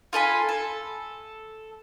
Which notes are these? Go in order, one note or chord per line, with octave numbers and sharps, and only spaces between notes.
F4 A4 G#5 B5
A4